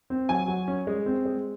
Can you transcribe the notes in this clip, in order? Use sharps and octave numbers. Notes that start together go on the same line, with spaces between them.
C4
F#3 G#5
F#3
C#4
G#3
C4
G#3